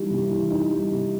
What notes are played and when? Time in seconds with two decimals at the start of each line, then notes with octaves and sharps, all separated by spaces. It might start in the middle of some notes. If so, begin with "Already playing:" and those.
Already playing: E3 G3 D#4
0.10 C3
0.30 E3
0.51 D#4
0.72 G3
0.92 C3